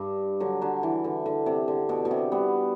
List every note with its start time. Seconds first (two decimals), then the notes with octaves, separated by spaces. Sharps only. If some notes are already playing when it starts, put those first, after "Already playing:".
Already playing: G2
0.40 D3 F#3
0.62 D3 F#3
0.83 E3
1.04 D3
1.26 D3
1.46 C3
1.68 D3
1.89 B2
2.05 B2
2.11 C3
2.32 G3 B3